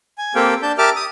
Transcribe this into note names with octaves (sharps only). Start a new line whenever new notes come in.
G#5
A#3 C4 G4 A4 F5 G5
D4 A5 G6
G4 A#4 E5 A5 D6 F6
D#6